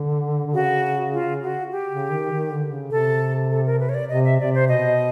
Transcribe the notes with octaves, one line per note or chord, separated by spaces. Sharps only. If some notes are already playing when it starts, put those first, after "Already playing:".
Already playing: D3
D3
C#3 F#4
F4
F#4
G4
C#3
D#3
D#3
D3
C#3
C3 A4
A4
A#4
B4
C#5
D5
C3 D#5
E5
C3 D5
C5
B2 D#5